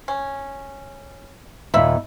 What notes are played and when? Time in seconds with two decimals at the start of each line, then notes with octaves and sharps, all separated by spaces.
0.08 C#4
1.74 D#2 A#2 E5 B5